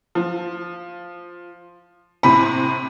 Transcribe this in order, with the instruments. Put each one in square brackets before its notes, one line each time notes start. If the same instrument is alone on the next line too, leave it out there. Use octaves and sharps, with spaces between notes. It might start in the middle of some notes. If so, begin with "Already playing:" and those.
[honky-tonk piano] F3
[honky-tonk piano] A2 C3 [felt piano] B5